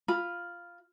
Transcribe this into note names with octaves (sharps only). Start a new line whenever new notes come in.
F4 B5